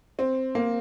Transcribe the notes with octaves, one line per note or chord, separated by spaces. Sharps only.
C4
A#3